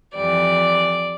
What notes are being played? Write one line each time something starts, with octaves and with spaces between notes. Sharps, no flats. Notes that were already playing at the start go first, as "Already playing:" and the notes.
F2 E3 G3 D5